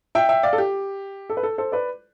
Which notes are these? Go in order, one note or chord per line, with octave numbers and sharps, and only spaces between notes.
E5 G5
E5 G5
D5 F5
A4
G4
A4
B4
A4
A4 C5
B4 D5